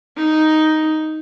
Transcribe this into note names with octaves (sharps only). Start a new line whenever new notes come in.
D#4